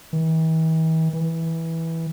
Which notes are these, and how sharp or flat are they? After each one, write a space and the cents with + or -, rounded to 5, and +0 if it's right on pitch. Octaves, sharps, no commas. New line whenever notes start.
E3 -45
E3 -10